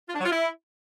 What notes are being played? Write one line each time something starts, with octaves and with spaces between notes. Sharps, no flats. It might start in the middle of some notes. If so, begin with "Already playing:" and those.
F4
D4
F#3
F4
E4